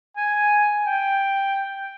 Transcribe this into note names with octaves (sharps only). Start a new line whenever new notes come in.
G#5
G5